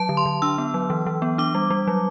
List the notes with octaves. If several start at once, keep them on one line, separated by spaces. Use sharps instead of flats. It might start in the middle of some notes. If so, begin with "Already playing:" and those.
Already playing: F#3 A5
D3
C6
D3
D4 E6
B3
F#3
E3
E3
B3
D4 D6
G3
G3
F#3